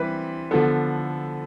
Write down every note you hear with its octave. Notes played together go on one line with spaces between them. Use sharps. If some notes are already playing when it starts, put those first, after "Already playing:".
Already playing: E3 G3 C4 B4
D3 F3 B3 A4